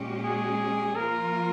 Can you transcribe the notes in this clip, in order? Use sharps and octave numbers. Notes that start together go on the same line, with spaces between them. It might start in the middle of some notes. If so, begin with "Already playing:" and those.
Already playing: A#2 G#3 C#4 G4
G#4
F3 A#3 F4 A#4